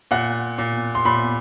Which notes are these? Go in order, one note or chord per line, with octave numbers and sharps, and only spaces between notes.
A#2 F#5
A#2
C6
A#2 B5